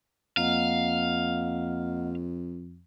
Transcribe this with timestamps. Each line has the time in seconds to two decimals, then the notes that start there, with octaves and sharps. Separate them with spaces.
0.37 F2 A#3 D#5 F5 F#5